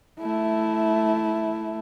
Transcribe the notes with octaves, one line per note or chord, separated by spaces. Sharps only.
A3 E4